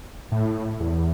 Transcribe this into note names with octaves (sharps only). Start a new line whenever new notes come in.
A2
E2